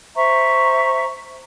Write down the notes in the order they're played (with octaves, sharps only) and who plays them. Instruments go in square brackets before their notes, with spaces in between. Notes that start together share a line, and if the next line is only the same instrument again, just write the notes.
[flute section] C5 E5 A#5 C#6